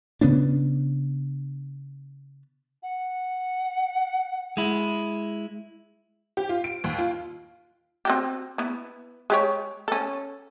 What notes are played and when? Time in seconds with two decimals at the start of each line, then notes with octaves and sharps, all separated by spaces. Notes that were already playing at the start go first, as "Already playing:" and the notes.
0.21 C#3 B3 C#4 D4
2.82 F#5
4.57 G#3 E4
6.37 G4
6.49 F4
6.64 D7
6.84 D#2
6.98 F4
8.05 C4 F#4 G4
8.58 B3 E4
9.30 G#3 G4 C#5
9.88 C#4 A4